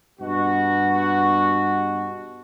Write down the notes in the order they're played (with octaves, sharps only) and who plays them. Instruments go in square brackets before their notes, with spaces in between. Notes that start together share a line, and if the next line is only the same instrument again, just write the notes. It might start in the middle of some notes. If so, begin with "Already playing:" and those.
[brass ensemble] G2 B2 F#4